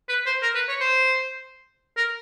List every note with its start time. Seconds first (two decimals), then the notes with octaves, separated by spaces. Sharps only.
0.09 B4
0.26 C5
0.43 A#4
0.55 B4
0.69 C#5
0.81 C5
1.97 A#4